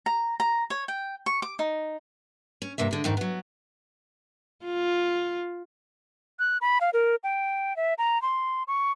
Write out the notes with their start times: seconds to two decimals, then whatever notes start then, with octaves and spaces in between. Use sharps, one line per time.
0.06 A#5
0.40 A#5
0.70 C#5
0.88 G5
1.26 C#6
1.42 D6
1.59 D#4
2.62 C#4
2.78 G2 C3 A#3 E5
2.91 D3 G#3
3.04 F2 G#2 D#3
3.17 F#3 B3
4.64 F4
6.39 F#6
6.61 B5
6.81 F5
6.93 A#4
7.24 G5
7.76 E5
7.98 A#5
8.22 C6
8.68 C#6